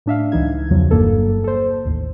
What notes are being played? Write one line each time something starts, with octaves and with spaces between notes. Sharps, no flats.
A2 D4 E5 F5
C#2 E3 D#4 G#6
E2 C#3 F3 F#3
G1 G2 A#3 A4
A4 C5
A1 D#2